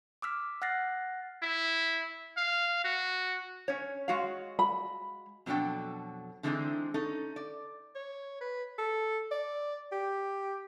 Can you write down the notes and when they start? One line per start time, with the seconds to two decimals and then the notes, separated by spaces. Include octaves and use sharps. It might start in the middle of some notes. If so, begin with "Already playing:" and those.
0.22 D6 E6 F6 B6
0.62 F#5 F6 F#6 A6 A#6 C7
1.43 E4
2.38 F5
2.84 F#4
3.68 C#4 C#5
4.08 G#3 F#4 F5
4.59 B5
5.46 F2 B2 F#3 D4 A4 G5
6.43 D3 E3 G#3 C4 D4 D#4
6.94 C#4 D#4 A4
7.36 D5
7.95 C#5
8.41 B4
8.79 A4
9.32 D5
9.92 G4